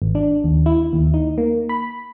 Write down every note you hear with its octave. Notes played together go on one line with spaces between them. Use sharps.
G#1
D4
D#2
E4
D#2
D#4
A#3
B5